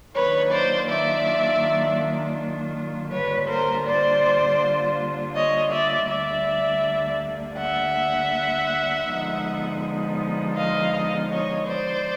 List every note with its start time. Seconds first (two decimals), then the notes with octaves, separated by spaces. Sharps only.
0.14 D#3 F#3 A#3 D4 F4 B4 C#5
0.51 C5 D5
0.89 D5 E5
3.12 D3 G3 A#3 D4 F4 B4 C#5
3.49 A#4 C5
3.86 C5 D5
5.35 C#5 D#5
5.73 D5 E5
6.09 D2 D3 G3 A#3 D4 D5 E5
7.58 E5 F#5
9.07 D3 F3 G#3 B3 D#4
10.56 D#5 F5
11.31 C#5 D#5
11.67 C5 D5